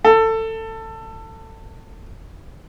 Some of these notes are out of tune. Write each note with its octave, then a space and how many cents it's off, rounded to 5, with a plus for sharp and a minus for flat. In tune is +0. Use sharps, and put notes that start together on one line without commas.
A4 +20